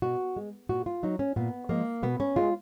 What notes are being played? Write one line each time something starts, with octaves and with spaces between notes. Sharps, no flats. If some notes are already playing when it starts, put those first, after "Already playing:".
B2 F#4
G#3
A#2 F#4
F4
F#3 D#4
C#4
A#2 B3
F3 G#3 A#3
B2 B3
C#4
G#3 F4